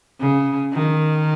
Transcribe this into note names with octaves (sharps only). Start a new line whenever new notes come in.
C#3
D#3